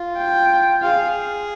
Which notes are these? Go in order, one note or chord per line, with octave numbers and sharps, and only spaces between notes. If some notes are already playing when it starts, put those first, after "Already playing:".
Already playing: F4
G5
F4 G#4 F5